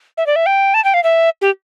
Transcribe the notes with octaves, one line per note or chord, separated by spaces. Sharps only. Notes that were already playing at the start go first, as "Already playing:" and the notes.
E5
D5
E5
G5
A5
G5
F5
E5
G4